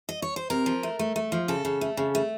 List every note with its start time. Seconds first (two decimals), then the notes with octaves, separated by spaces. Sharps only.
0.09 D#5
0.22 C#5
0.36 C5
0.50 C3 A#4
0.66 F3
0.83 A3
0.99 A3
1.16 A3
1.32 F3
1.48 C#3 A4
1.65 C#3
1.81 A3
1.97 C#3
2.15 A3